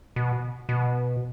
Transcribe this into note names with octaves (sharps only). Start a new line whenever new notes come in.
B2
B2